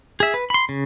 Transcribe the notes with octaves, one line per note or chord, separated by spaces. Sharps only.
G#4 E5
B4
B5 C6
C#3